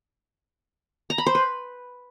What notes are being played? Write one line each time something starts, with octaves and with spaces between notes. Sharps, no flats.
A#5
B5
C5
B4